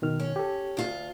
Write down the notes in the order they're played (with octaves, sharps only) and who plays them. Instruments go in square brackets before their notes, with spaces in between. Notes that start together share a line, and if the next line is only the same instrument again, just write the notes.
[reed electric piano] B2 D#3 F6
[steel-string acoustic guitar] C#4
[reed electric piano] G4 A4
[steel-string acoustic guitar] D2 F4